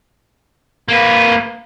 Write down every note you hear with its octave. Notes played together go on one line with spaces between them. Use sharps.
A#3 B4